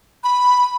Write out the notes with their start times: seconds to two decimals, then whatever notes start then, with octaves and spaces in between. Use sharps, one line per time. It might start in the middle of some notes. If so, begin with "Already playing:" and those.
0.24 B5